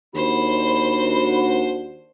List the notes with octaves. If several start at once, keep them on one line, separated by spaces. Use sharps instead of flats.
D#2 D4 F#4 C5 B5